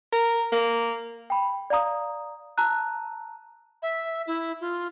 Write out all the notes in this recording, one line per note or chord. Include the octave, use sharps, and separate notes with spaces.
A#4
A#3
G5 B5
D5 F5 A#5 D#6
A5 A#5 E6 F#6
E5
E4
F4